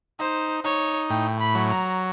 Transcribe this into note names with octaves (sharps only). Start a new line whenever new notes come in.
D#4 C5
D#4 C#5
A2 G5
B5
F#3
A#5